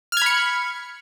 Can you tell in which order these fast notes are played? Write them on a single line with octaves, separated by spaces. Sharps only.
F6 G#6 B5 C#7